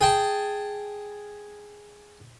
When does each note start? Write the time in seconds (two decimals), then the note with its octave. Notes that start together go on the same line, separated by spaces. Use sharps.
0.01 G#4 G5 A5